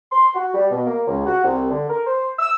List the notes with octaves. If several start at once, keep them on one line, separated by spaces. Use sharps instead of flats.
C6
F#4
G3
B2
A#3
C#2
F#4
C2
D3
A#4
C5
E6